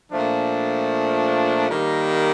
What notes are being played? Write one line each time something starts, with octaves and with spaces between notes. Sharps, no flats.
A#2 F3 A3 D4
D#3 G3 A#3